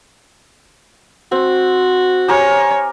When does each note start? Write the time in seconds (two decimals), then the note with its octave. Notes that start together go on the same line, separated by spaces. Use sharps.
1.32 C4 F#4
2.28 G4 A#4 C#5 G#5